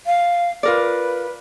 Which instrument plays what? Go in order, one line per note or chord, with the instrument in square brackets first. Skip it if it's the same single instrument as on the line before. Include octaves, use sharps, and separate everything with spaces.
[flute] F5
[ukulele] F4 A#4 D5 [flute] B4